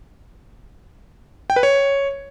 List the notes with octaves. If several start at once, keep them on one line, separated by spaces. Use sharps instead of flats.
G5
B4
C#5